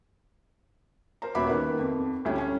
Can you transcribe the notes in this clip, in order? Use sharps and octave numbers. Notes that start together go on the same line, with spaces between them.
A#4 C5 A#5
D#1 B3 F#4 E5 B5 D6
D#3 A#3 B3
F2
D2 G3 C#4 E4 G5
C#4